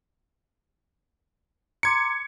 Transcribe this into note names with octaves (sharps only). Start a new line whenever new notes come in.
A#5 C6 D6 G#6 C#7